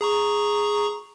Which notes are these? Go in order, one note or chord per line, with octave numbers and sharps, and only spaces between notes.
G#4 A#5 C#6